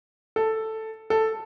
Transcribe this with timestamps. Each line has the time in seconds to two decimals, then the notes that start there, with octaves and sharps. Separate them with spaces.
0.36 A4
1.10 A4